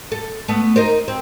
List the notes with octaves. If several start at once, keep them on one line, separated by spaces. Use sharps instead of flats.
A4
A3 B3
D#4 A#4 C5
C4